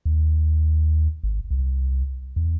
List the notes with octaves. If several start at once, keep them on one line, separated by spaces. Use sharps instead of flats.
D#2
G#1
C2
E2